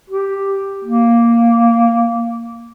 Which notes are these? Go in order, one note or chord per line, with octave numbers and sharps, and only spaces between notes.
G4
A#3